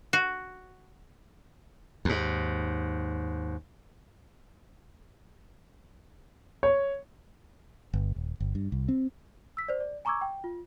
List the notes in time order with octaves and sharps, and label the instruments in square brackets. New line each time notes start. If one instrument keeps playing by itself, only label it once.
[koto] F#4
[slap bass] D#2 G#2
[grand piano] C#5
[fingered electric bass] G1
D#1
G1
G2
C2
C4
[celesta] E6 B6
C5 D5
D5
G#5 A#5 C#6 D6 E6 G#6
G5
F4